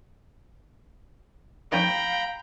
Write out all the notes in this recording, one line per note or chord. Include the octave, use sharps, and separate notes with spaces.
D#3 F3 C#4 F5 G5 A#5 B5